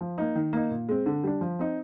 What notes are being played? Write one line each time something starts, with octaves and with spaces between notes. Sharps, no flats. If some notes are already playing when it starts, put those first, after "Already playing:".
F3
A#3 D#4
D#3
A#3 D#4
A#2
G#3 C4
D3
G3 D4
F3
C4 D#4